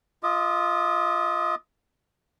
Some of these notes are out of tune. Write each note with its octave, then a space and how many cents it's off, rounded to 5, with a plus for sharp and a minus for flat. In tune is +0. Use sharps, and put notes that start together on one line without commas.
F4 -5 D#5 +35 D#6 -40